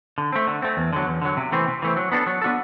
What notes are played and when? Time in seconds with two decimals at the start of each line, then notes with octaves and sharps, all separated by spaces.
0.18 D3
0.33 A3 C4
0.47 D3
0.62 A3 C4
0.77 E2
0.93 D3 F#3
1.07 E2
1.22 D3 F#3
1.37 C3
1.52 E3 A3 C4
1.68 C3
1.82 E3 A3 C4
1.97 F#3
2.12 B3 D4 F#4 A4
2.27 F#3
2.42 B3 D4 F#4 A4